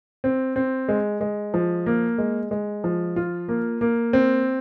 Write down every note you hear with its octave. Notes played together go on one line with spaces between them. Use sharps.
C4
C4
G#3
G#3
F3
A#3
G#3
G#3
F3
F4
A#3
A#3
C4